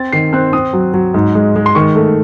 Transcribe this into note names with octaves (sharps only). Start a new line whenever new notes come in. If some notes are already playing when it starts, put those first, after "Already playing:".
Already playing: C4 A6
D#3 C7
C4 F#6
C4 D#6
F#3
F#3
G#2
G#3
G#3
C6
D#3 C#6
A3